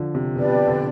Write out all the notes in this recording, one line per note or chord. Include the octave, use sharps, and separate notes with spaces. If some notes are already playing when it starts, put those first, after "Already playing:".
Already playing: D3 F3
C3
B2 D4 G4 B4 D5
C3
D3